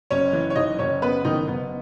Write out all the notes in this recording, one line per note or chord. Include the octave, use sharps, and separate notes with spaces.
F#1 C#4 C#5
E3
C#5
F#1 D#4 D#5
F#1 C#4 C#5
C#3 B3 B4
F#1 D#3 D#4
F#1 B3